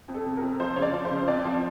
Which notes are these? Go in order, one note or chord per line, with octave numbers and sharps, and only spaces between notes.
F2
A4
C3
A#4
F2
F3 C5
C#3 C#5
D5
F3
C5
C#3
F2 D5
F3